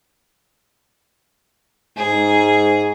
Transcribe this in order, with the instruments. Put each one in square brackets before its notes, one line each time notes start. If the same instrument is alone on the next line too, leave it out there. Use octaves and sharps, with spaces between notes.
[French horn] G#2 [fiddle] G#4